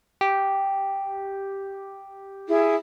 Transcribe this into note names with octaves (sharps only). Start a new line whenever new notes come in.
G4
E4 G#4